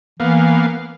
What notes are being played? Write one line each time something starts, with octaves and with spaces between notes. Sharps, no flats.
E3 A#3 B3 F5